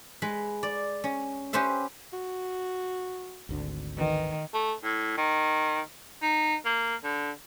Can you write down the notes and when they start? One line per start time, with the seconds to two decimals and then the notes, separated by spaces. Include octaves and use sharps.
0.22 G#3 B4 B5
0.63 D5
1.04 C#4
1.53 C#4 G4 B4 C5 E5
2.13 F#4
3.49 G#1 D2 D3
3.98 D#3 E3
4.54 A3
4.84 A2
5.18 D#3
6.22 D#4
6.65 A#3
7.04 D3